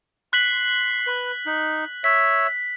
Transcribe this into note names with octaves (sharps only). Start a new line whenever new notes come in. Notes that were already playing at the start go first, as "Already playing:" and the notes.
C6 F#6 B6 F#7
B4
D#4
C#5 E5 B6